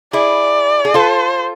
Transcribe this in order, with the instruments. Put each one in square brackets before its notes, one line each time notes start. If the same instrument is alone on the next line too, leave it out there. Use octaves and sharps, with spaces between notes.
[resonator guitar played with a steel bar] E4 G#4 [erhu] D5
[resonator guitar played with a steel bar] G#4
[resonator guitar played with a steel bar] F4 A4 [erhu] C5